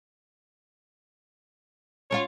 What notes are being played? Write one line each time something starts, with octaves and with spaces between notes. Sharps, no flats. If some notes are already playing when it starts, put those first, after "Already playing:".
C#4 D4 F4 C#5